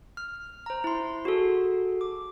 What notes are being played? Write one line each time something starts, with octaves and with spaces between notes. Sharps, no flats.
F6
C5 A#5
E4 C6
F#4 G#4 A4
D6